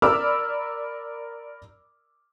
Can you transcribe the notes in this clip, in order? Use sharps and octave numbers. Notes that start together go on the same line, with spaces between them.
A#4 D5 B5 D6 E6 F6